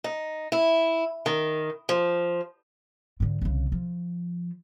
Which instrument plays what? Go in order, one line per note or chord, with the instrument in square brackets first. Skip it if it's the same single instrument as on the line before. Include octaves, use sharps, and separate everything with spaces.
[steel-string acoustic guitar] D#4
E4
D#3
F3
[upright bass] G#2 D3
C2 C#3
F3